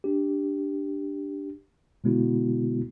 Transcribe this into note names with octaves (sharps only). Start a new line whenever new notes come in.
D4 G4
B2 D3 G#3 B3 E4 F#4